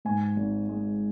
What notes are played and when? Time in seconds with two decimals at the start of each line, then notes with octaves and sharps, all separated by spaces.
0.05 G#2 G#5
0.37 G#1
0.69 G#3